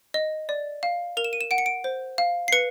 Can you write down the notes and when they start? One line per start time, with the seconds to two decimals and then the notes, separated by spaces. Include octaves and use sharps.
0.14 D#5
0.49 D5
0.83 F5
1.17 A#4 F7
1.24 E7
1.33 D#7
1.41 E7
1.51 F#5 D7
1.58 C#7
1.66 D7
1.84 C5
2.18 F5
2.48 C7
2.52 B4 C#7